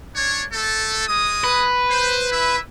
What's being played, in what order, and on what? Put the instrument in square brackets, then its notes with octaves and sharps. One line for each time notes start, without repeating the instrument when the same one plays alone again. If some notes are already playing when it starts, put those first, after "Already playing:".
[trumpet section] D4 C#5
A3 A4
G#3 D#6
[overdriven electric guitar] B4
[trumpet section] C5
E4 E5